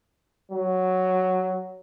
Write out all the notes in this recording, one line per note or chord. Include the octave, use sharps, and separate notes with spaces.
F#3